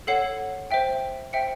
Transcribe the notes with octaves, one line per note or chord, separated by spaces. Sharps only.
A4 C#5 F#5 C7
C5 E5 G5
C5 E5 G5 C#7